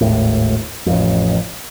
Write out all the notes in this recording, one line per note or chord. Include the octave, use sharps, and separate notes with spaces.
G#1 D#2 A2
A1 F2